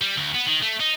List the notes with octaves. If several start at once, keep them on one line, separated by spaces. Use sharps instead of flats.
G3
D2
B3
D#3
A3
D#4